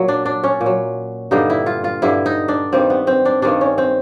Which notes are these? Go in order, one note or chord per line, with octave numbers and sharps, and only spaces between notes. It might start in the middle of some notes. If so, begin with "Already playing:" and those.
Already playing: A#2 F#3
D4
D4
C#4
A#2
F#3
G2 D3 G3 D#4
E4
F4
F4
G2 D3 G3 E4
D#4
D4
G2 D#3 G3 C4
B3
C4
D4
G2 D#3 G3 D4
C#4
C4